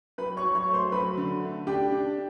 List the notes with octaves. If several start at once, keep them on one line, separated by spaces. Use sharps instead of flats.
F#3 B4 B5
C#5 C#6
F#3
C#5 C#6
A3
C5 C6
F#3 B4 B5
D3
A3
D4 G4 G5
D4